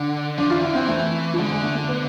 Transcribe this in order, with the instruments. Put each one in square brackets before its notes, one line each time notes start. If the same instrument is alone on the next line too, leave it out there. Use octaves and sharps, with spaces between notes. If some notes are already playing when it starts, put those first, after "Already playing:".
Already playing: [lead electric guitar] D3 [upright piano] D4
[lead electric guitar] F3 [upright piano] D4
[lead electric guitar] E3 [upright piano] F4
[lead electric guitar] D3 [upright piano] E4
[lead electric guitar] E3 [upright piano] C4
[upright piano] A3
F3
[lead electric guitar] D3 [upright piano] G#3
[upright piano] G#3
A3
A3
B3